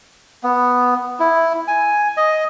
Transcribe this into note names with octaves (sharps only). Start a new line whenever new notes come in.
B3
E4
G#5
D#5